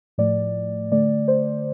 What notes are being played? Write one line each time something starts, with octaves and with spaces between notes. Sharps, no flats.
A2 F3 A3 D5
D3 A3 D5
C5